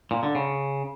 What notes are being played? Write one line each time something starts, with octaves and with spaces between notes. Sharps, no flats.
A#2
D3
C#3